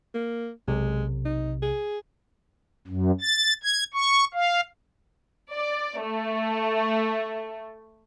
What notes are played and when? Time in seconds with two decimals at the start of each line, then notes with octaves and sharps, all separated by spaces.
0.14 A#3
0.68 B1 C3 G#3
1.25 D#4
1.62 G#4
2.87 F#2
3.21 A6
3.63 G#6
3.94 C#6
4.34 F5
5.53 D5
6.01 A3